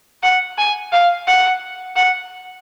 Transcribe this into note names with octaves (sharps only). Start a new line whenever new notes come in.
F#5
G#5
F5
F#5
F#5